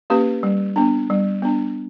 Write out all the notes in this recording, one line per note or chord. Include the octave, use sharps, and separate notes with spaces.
A#3 C#4 G4 B4
G3
B3 D4
G3
B3 D4